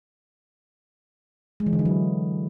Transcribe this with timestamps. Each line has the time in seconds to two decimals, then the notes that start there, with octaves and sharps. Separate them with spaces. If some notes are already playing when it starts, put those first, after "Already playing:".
1.60 G#3
1.66 E3
1.73 D3
1.79 E4
1.85 F#3